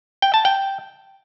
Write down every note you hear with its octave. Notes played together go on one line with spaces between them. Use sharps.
G5
A5
G5